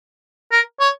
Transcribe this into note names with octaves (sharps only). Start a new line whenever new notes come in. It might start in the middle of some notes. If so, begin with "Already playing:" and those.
A#4
C#5